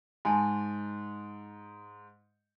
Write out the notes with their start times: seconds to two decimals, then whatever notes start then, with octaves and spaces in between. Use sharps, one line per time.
0.25 G#2 G#5 A5 C6